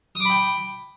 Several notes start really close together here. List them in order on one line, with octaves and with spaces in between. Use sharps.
D#6 D6 B5 G5